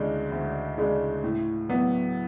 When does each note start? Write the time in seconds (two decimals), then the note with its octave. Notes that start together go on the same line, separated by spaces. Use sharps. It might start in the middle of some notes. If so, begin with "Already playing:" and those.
Already playing: D2 C#3 G#3 D4
0.32 D2
0.78 C#3 G#3 D4
1.24 A2
1.69 F#3 B3